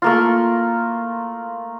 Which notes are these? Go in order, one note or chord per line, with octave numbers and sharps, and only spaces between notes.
A3 A#3 F4